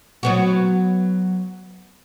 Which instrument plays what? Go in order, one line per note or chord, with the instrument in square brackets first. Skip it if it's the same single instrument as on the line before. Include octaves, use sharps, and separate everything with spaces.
[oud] F#3 B3 F#4